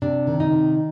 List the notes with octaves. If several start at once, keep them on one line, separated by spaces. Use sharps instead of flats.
C3 D4
D#3
D#4
C3